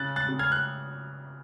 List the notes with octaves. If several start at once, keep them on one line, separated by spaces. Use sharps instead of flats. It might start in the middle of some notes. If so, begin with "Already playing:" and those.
Already playing: C#3 F#6 A6
F#6 A6
C#3
F6 G#6
F#6